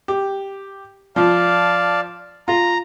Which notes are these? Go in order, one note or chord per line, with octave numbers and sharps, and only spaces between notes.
G4
F3 D5 F5 A5
F4 A#5